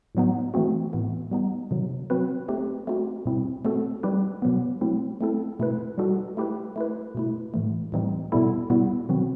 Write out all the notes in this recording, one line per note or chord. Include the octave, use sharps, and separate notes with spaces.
A2 F#3 B3 D#4
E3 A3 C4 F#4
A2 E3 B3
G3 B3 D#4
C3 D#3 F#3
F#3 C4 F#4 B4
A3 C4 D#4 G4
A3 C4 D#4 F#4
B2 G3 C4 E4
A3 C4 F#4 A4
G3 D#4 G4 B4
B2 F#3 B3
F#3 A3 C4 E4
A3 C4 E4 A4
B2 A3 E4 B4
G3 D#4 F#4 A4
A3 E4 G4 B4
A3 E4 B4
B2 A3 E4
A2 E3 A3
A2 E3 G3 C4 D#4
B2 G3 B3 E4 A4
B2 G3 B3 E4
C3 D#3 F#3 C4 F#4